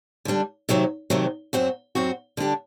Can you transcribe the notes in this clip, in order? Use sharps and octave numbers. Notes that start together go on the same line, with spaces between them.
D3 G3 D4
C3 D#3 F#3 A3 C4
C3 D#3 F#3 A3 C4
F#2 F#3 C4 F#4
F#2 F#3 C4 F#4
D3 G3 D4 G4